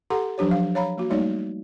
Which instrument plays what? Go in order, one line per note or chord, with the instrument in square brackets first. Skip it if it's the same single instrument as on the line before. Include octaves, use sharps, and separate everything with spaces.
[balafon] G4 A4 F#5 A#5 C6
F3 F#3 D4 G4 C#5
F5
C#5 F5 A#5 B5
A#3 F#4
G3 A3 A#3 D#4 C#5 D5